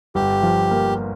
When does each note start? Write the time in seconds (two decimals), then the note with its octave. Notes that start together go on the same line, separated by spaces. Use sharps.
0.15 G1 G4
0.43 F3
0.71 A#3